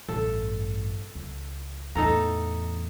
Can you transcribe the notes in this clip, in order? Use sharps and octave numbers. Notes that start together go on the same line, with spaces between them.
A1 G2 A4
C#2
E2 A2 D#4 A4 A#5